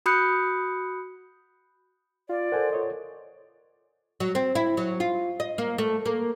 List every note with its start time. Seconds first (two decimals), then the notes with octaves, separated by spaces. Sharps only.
0.06 F#4 B5 D#6 F#6 G6 C#7
2.29 F4 D5
2.52 A4 A#4 C5 F#5 G#5
2.73 F4 C#5 D#5
4.20 F#3
4.35 C4
4.55 E4
4.77 F#3
5.00 F4
5.40 D#5
5.58 A#3
5.78 A3
6.06 A#3